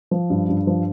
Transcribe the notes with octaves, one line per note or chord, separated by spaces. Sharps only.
F3
G2
G2
F3